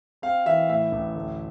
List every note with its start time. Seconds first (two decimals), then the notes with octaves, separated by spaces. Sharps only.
0.22 C4 F5
0.46 E3 E5
0.69 A2 E5
0.92 A1
1.15 D2